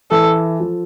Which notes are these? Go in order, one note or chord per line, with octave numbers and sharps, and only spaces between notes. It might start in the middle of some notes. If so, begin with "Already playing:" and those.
E3 A4
F3